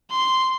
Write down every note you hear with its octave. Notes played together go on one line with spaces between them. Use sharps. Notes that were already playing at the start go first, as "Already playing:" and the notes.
C6